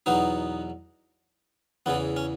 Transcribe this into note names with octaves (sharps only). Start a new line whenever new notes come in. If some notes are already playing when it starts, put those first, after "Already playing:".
E2 B2 F#3 B3 D#4
E2 C#3 E3 B3
C#4